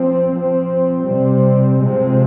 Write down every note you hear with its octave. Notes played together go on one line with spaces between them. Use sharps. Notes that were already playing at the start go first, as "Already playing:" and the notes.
Already playing: F3 C4
F3 C4
C3 G3 C4
C3 F3 G#3 C4